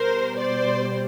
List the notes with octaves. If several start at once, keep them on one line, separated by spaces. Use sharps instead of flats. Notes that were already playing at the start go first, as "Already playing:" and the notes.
Already playing: B2 G3 A#4 C5
C5 D5